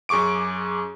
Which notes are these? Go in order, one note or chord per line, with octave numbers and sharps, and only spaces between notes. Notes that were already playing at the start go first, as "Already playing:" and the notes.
F#2 G#4 C#6 D6 D7